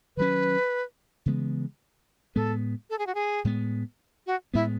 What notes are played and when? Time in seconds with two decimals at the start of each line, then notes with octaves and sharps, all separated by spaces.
0.17 D#3 F#3 C#4 B4
1.26 C#3 E3 G#3 B3
2.36 A2 G#3 B3 A4
2.90 A4
2.99 G#4
3.07 F#4
3.15 G#4
3.44 A2 G#3 B3
4.27 F#4
4.54 A2 G#3 B3 E4